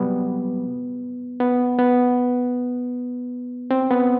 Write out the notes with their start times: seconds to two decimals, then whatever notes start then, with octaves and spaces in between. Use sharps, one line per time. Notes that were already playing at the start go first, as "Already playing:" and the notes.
Already playing: C3 F#3 G3 B3
1.40 B3
1.78 B3
3.71 C4
3.91 B3